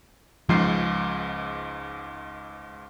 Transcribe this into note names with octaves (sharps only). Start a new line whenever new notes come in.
C#2 G#2 F3 C7